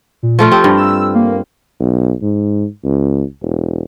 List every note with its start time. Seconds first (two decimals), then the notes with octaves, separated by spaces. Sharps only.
0.23 A#2
0.39 F3 A3 F4
0.52 C4 G4
0.64 G2
0.77 E6
1.15 A#3
1.80 B1
2.22 G#2
2.84 C#2
3.42 E1